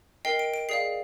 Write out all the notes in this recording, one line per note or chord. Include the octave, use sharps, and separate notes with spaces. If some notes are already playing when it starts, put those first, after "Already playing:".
A#4 D#5 G5 C7
D7
D7
G#4 D5 F5 C7